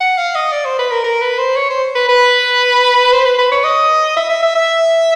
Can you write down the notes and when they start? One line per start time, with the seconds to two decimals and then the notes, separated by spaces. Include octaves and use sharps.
0.01 F#5
0.18 F5
0.35 D#5
0.52 D5
0.65 C5
0.79 B4
0.91 A#4
1.04 A#4
1.22 B4
1.39 C5
1.56 C#5
1.70 C5
1.95 B4
2.09 B4
3.13 C5
3.26 B4
3.39 B4
3.52 C#5
3.64 D#5
4.17 E5
4.30 E5
4.43 E5
4.55 E5